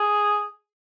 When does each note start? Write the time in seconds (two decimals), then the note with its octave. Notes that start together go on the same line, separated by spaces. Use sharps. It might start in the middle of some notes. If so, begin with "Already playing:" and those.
Already playing: G#4